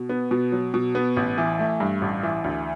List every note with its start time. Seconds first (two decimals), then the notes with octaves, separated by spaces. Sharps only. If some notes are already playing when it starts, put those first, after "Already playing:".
Already playing: B2
0.09 B3
0.31 B2
0.52 F#3
0.74 B2
0.95 B3
1.17 A1
1.38 E3
1.59 A3
1.80 G2
2.02 A1
2.23 E3
2.44 D2